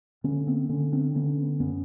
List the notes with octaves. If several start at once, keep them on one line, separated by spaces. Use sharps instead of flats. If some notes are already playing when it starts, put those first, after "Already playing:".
D3 B3 C#4
A#3 C4
D3 B3 C#4
C4 D4
D3 B3 C#4
F#2 B3 C#4